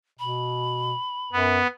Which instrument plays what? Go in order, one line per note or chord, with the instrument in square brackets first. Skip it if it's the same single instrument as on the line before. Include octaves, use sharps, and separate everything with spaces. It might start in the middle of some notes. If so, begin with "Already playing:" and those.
[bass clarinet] B2 [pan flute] B5
[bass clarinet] F#2 [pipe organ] B3